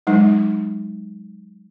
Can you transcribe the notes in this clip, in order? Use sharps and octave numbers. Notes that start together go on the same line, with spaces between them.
F#3 G#3 D#4